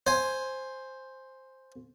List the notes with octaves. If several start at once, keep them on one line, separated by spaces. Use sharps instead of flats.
C5 G#5